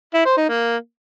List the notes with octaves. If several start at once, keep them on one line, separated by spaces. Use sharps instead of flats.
E4
C5
D#4
A#3